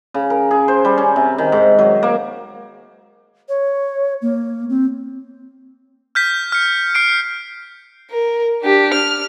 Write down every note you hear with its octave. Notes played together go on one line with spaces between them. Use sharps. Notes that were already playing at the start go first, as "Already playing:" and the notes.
C#3
A#4
G#4
C5
G3
C#4
C3
D#3
G#2
F#3
A#3
C#5
A#3
C4
F6 G6 B6
F6 C#7
F6 C7 D7
A#4
D4 G4
F6